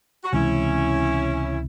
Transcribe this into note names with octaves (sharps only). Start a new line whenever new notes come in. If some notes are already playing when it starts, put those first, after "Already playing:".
F#4
C#2 C3 E3 G#3 C#4 E4